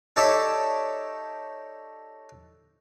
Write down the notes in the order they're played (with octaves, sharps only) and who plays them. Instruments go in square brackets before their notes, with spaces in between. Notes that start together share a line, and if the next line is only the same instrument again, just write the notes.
[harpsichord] D#4 G4 A4 C#5 D5 E5